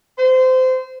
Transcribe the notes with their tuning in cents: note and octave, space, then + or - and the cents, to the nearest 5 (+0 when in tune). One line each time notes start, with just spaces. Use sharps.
C5 -25